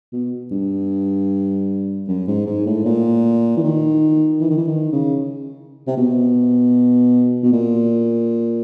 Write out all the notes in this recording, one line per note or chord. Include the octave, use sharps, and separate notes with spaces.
B2
G2
F#2
G#2
G#2
A2
A#2
E3
D#3
E3
D#3
E3
D#3
C#3
C3
B2
B2
A#2